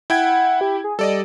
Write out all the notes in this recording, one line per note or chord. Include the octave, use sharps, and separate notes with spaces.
E4 F#5 G5 G#6
G4
G#4
G3 A4 D5 D#5